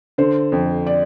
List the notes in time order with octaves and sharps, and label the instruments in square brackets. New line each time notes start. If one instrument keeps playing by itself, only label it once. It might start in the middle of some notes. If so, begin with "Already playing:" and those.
[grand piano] D3 [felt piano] C5
[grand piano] F2
[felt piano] D5